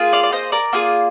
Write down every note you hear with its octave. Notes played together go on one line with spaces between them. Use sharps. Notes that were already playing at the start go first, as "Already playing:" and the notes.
Already playing: A#3 F4 G#4
D5 F5
D5
C5 D#5
A#4 D5
A#3 F4 G#4